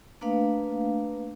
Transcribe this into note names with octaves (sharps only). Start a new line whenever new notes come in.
A3 A#3 D4 B4 F5